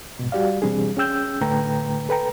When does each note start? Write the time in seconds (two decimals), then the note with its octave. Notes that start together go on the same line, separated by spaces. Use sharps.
0.19 G#2 B2
0.32 G3 F#4 G4 D5 F5
0.62 B2 E3 G3 C4 D4 G#4
0.97 C#4 G#4 G5 E6 G6
1.41 A2 D3 A3 B4 G5 A#5
2.09 A4 B4 G5 A#5